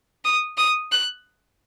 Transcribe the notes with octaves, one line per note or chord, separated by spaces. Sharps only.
D#6
D#6
F#6